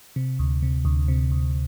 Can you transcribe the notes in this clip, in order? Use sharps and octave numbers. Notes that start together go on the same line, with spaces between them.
C3
D2
C3
D2
C3
D2